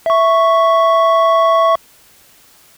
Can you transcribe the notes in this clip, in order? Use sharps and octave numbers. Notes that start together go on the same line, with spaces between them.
E5 C#6